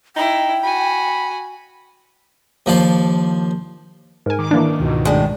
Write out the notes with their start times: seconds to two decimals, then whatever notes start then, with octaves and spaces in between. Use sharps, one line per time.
0.16 D#4 E4 G5
0.63 F#4 G#5 B5
2.66 D#2 F3 D4 F5
4.26 G#2 A#4 G#5
4.39 D#3 D6
4.51 E3 A#3 D4
4.80 C#2 G#2 B2
5.05 A2 G#3 D4